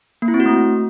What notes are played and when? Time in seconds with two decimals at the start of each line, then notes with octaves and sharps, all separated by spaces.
0.22 A#3
0.28 E4
0.34 C4
0.40 F#4
0.46 A3